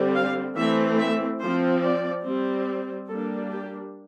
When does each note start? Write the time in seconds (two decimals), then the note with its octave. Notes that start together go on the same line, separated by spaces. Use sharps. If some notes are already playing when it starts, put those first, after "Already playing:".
Already playing: D3 G3 C4
0.14 F5
0.56 E3 A3 C4 E5
0.98 E5
1.40 F3 C5
1.45 C4
1.82 D5
2.25 G3 C4
3.08 G3 A#3 D4 A4
3.51 G4